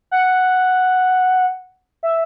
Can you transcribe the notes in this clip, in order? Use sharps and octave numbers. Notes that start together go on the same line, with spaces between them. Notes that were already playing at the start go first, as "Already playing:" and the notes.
F#5
E5